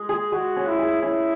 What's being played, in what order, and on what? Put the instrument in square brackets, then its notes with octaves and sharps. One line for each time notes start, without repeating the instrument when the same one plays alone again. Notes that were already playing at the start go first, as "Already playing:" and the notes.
Already playing: [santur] G#3
G#4
[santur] G#3 [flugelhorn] F#4
[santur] C#4
[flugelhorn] E4
[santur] G#4
[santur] C#4 [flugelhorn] E4